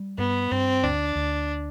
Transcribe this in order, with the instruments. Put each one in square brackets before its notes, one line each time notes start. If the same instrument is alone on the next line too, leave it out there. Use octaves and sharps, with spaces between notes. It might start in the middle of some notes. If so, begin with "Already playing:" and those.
Already playing: [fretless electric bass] G3
[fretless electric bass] G2 [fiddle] B3
[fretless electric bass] G2 [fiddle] C4
[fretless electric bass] D2 [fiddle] D4
[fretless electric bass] D2